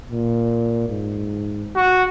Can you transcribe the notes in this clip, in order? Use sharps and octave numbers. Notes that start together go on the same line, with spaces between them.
A#2
G#2
F#4